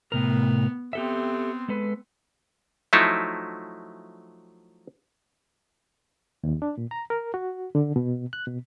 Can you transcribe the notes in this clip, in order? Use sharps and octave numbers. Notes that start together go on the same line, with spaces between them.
A2 C3 B3 A#4
B3 C4 G4 A4 E5
G#3 A4 B4
F3 F#3 A3 D#4 E4
D#2
D4
A#2
A#5
A#4
F#4
D3
B2
F#6
B2